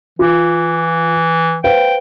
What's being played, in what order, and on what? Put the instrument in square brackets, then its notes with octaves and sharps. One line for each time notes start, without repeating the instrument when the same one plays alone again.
[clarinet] E3 [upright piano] F4 D6
[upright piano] B4 C5 F5 [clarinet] G5